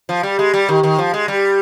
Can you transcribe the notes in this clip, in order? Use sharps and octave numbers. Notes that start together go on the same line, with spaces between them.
F3
G3
G#3
G3
D#3
D#3
F3
G#3
G3